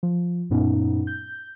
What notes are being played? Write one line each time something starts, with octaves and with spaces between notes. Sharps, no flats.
F3
F#2 A#2 B3 C#4 D#4
G6